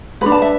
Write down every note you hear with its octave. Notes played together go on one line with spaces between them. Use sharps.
D4 F#4 B4 B5
A5
E5